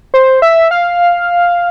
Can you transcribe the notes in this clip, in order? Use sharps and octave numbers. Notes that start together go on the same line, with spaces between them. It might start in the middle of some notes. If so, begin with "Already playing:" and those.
C5
E5
F5